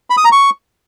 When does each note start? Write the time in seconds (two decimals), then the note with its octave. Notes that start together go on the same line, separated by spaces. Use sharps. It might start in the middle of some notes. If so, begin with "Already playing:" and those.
0.10 B5
0.17 D#6
0.25 A#5
0.32 C#6